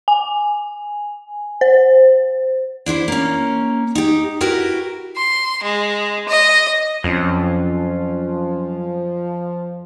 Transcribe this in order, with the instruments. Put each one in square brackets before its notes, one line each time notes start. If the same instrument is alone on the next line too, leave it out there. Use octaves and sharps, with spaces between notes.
[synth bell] G#5
C5
[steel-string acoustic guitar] D4 E4 B4 C5
A#3 C#4
D#4 G4
E4 F#4 G4 A#4 B4
[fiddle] C6
G#3
D#5
[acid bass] F2 [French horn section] F3 [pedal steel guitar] F#3 C#4 F4